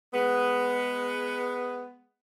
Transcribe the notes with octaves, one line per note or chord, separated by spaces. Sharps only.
G#3 B3